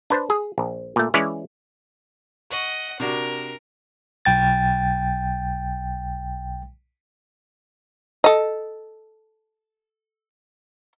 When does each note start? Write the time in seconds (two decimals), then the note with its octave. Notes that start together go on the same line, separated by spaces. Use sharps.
0.10 D4 B4 C5
0.30 G#4
0.58 A#1
0.96 A#2 A3
1.14 E3 G#3 C#4 E4 C#5 D5
2.50 D#5 F#5 C#6
3.00 C3 D4 F#4 A#4
4.25 B1 G5 A6
8.24 A4 D#5